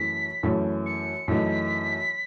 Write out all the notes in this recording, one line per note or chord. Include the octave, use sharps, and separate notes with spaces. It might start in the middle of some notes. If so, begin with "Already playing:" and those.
Already playing: F#2 E3 A3 C#4 B6
F#2 E3 A3 C#4
C#7
F#2 E3 A3 D#4 B6